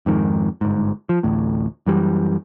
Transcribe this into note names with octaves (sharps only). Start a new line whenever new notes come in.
F2 G#2 D#3
G1 G#2
F3
A1 D2 A2
F#2 E3 G3